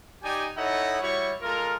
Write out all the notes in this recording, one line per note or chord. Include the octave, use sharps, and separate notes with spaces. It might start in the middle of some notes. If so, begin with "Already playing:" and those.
D#4 G4 D5 G5 G#5
D#4 E4 A4 C#5 D#5 F#5
G3 E4 F#4 C#5 C#6
G#3 F4 A4 A#4